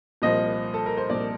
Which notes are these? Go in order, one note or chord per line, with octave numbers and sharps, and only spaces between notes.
C2 A#2 F3 D#5
A4
A#4
C5
C2 A#2 F3 D5